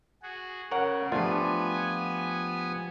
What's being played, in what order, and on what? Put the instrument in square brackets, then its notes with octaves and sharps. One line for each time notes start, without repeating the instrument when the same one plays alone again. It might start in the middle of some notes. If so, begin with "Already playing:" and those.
[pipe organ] F#4 G#4
[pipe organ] C#3 [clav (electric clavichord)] A#4 C#5 F#5
[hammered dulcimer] F3 G4 [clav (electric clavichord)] A3 D4 F4 [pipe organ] B3 G#5